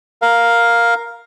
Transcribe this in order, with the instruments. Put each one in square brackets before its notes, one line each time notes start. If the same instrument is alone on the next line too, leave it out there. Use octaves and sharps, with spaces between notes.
[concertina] A#4 F5